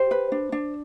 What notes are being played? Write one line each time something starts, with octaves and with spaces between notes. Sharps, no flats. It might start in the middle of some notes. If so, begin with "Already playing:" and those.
Already playing: G4 C5
B4
D4
D4